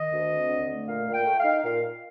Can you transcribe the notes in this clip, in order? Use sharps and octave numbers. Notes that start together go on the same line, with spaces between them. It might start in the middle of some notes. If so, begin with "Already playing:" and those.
Already playing: D#3 D#5
D2
C4
D3
A3
A#2 F5
A#2
G5
A3
F5
D#4
A#2 F5